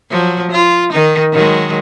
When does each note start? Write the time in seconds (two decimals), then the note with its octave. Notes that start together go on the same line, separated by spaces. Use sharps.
0.11 F3 F#3
0.52 F4
0.92 D#3 D#4
1.33 D#3 F#3 G#3